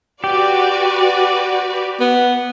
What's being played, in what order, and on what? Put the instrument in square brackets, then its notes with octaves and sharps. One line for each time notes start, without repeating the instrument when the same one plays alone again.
[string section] F#4 B4 D5 [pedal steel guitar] G4
[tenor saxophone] B3